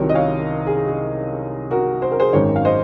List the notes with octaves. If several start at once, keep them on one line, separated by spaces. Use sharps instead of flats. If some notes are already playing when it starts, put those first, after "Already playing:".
Already playing: C2 C3 D#3 F#3 A#4 C#5
D#5
C#5 F5
G#4
G#4
F#4 A#4
C5
A#4
G#4 C5
G#1 F#2 D#3 A#4 C#5
F5
C5 D#5